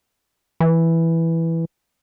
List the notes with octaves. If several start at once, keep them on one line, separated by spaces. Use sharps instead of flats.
E3